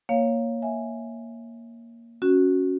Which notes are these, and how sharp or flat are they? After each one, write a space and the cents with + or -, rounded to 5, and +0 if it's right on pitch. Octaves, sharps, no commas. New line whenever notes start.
A#3 +0 C#5 +0 F5 +0
E5 -10 G#5 +0
C#4 +0 F#4 +0